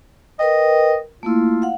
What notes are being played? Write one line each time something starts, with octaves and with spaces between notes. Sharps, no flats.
A#4 B4 D#5 G5
A3 A#3 E4 F4
F5 F#5